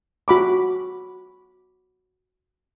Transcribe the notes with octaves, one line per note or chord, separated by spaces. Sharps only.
F#4 B5 D6